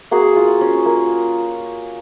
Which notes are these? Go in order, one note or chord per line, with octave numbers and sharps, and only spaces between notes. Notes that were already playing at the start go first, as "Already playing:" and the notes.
A#3 F#4 G#4
F4
C#4
A#3